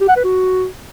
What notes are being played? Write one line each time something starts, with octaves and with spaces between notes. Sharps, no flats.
G4
F#5
B4
F#4